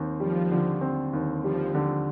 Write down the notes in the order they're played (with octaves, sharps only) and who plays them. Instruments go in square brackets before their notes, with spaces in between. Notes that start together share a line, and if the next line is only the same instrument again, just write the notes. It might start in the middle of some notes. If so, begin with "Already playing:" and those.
Already playing: [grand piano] D#2 C4
[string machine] F3 [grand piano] G3
[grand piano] D3
C4
D#2
[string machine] F3 [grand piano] G3
[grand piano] D3